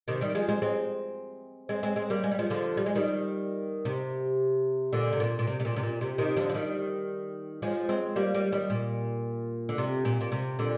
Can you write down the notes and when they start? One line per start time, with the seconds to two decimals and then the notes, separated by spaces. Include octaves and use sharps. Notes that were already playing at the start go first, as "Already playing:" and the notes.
0.08 C3 D#3
0.21 D#3 G3
0.35 F3 G#3
0.49 G#3 C4
0.62 G#3 C4
1.69 G#3 C4
1.83 G#3 C4
1.96 G#3 C4
2.10 G3 A#3
2.24 G#3
2.32 G3
2.39 F3 G#3
2.50 D3 F3
2.77 G3
2.86 G#3
2.95 D#3 G3
3.85 C3
4.93 A#2 D3
5.13 C3
5.20 A#2
5.39 A#2
5.47 C3
5.60 C3
5.65 A#2
5.76 C3
5.83 A#2
6.01 C3
6.18 C3 D#3
6.36 D3 F3
6.50 F3
6.54 D#3 G3
7.62 F3 G#3
7.89 G#3 C4
8.16 G3 A#3
8.34 G3 A#3
8.52 D#3 G3
8.70 A#2
9.69 D3
9.78 C3
10.05 A#2
10.21 A#2
10.32 C3
10.59 A#2 D3